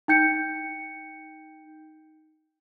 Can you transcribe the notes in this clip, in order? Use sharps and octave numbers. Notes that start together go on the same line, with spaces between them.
D#4 G5 G6 C#7